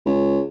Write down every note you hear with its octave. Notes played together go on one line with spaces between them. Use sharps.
C#2